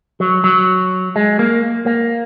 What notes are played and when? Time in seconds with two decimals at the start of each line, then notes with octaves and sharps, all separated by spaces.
0.20 F#3
0.44 F#3
1.16 G#3
1.39 A#3
1.86 A#3